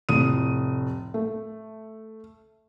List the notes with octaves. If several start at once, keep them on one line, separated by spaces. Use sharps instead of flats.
F1 A2 D#6 D#7
A3